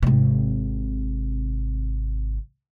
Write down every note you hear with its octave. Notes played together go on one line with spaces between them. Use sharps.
G#1 C3